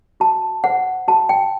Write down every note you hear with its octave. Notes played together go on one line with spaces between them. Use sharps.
F#4 A5
C5 F#5
F#4 A5
G5